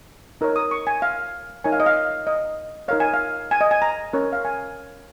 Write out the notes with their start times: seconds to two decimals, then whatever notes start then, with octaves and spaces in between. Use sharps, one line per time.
0.41 D#4 A#4 C#5
0.56 D#6
0.71 C#6
0.87 G#5
1.02 F5
1.64 D#4 A#4 C#5 G#5
1.72 F5
1.80 D#5
1.86 F5
2.27 D#5
2.88 D#4 A#4 C#5 F5
3.00 G#5
3.14 F5
3.51 G#5
3.61 D#5
3.71 G#5
3.82 A#5
4.13 C#4 A#4 C#5
4.33 F5
4.45 G#5